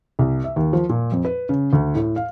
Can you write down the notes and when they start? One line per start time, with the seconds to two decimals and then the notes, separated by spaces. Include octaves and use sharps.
0.19 C2
0.44 E5
0.56 D#2
0.73 F3
0.89 A#2
1.12 F2
1.25 B4
1.49 C#3
1.73 D2
1.95 A2
2.16 F5